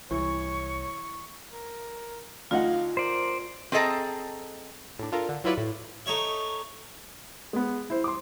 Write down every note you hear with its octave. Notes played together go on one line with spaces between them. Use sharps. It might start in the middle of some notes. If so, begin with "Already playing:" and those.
C2 E3 C#5 C#6
A#4
D2 D#4 F4 F5 F#5
A#4 C5 D5
C4 G#4 A4 D#5 A5 A#5
A2 D4
D4 F4 A4 A#4
D3
F#3 E4 F4 B4 D5 F#5
A2
A3 D#4 C#5 E5
G#3 B3
E4 C5
C6 D6